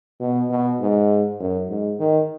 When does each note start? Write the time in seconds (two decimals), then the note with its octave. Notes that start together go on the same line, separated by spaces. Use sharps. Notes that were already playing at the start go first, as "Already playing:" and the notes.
0.20 B2
0.50 B2
0.80 G#2
1.40 F#2
1.69 G#2
1.99 D#3